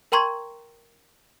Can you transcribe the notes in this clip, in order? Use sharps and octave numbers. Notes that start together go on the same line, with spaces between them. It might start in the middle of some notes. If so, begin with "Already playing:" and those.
A#4 G5 A#5 C6 C#6 G#6